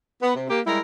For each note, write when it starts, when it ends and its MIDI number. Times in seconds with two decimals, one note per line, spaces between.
0.23 0.35 59
0.36 0.46 48
0.50 0.61 58
0.50 0.61 67
0.67 0.80 55
0.67 0.80 56
0.67 0.80 64
0.67 0.80 70